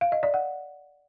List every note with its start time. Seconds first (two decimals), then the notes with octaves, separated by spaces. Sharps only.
0.01 F5
0.12 D#5
0.23 D5
0.34 F#5